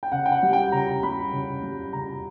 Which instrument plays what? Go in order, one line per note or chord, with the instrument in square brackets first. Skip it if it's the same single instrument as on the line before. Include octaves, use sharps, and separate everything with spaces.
[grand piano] G5
C#3 F#5
G5
F#5
G3
G5
C#3 A#5
G3 B5
C#3
G3
C#3 A#5